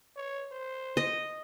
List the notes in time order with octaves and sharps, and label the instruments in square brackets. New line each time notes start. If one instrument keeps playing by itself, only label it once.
[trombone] C#5
C5
[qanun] D#5